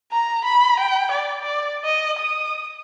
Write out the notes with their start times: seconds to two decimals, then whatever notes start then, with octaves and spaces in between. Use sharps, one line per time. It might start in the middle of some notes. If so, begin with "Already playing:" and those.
0.12 A#5
0.44 B5
0.80 G5
1.11 D5
1.42 D5
1.84 D#5
2.19 D#6